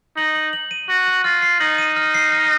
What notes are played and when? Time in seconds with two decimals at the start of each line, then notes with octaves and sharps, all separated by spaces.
0.17 D#4 F#7
0.35 F#7
0.53 F#7
0.71 D#7
0.89 F#4 F#7
1.07 F#7
1.24 F4 F6
1.42 C7
1.60 D#4 F#7
1.78 D#7
1.96 F6
2.14 C7
2.32 F6